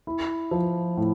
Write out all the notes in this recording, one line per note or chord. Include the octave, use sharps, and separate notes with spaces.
E4
F3
A2